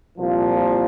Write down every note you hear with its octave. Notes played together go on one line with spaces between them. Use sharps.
C2 A#2 F3